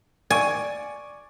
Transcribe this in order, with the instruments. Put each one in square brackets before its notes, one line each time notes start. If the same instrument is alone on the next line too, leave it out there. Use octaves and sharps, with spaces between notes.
[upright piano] D5 C#6 D7 [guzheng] G#5